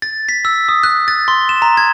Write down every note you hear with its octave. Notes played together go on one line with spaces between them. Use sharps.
A6
B6
E6
D#6
F#6
A6
C6
E7
A#5
G#6